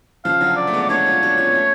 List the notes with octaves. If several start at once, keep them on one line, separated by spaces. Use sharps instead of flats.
C#3 F3 F5
D3 F#3
D5
A3
G#3 B3
D5
B3 D4 C#5
C#4 F4
D4 F#4
C#4 F4
B3
A3 C#4